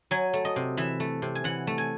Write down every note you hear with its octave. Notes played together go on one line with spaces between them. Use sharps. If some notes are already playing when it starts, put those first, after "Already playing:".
F#3 G#5
A3
D#5
C3
E3 E5
A3
C3
G#5
E3 F#5
A3
G#5